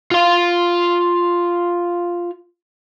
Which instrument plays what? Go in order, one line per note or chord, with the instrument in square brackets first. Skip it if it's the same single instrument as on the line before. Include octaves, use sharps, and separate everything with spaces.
[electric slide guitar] F4 F5